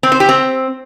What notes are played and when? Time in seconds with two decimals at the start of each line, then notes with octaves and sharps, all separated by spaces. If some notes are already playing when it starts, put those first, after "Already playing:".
0.03 C4
0.12 C5
0.20 G4
0.29 C4